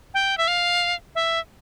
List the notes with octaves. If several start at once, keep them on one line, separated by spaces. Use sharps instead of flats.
G5
E5
F5
E5